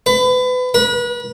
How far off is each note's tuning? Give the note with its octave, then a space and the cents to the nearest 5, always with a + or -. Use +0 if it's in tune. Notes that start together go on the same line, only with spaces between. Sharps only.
B4 +30
B4 -35